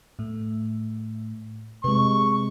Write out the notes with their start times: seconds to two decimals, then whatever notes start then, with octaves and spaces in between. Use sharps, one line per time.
0.19 A2 A3
1.84 C3 G#3 B4 C#6